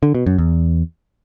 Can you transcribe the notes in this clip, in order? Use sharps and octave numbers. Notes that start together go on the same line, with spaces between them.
D3
B2
F#2
E2